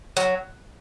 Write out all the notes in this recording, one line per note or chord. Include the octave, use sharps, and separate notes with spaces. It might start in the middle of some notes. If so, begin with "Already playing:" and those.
F#3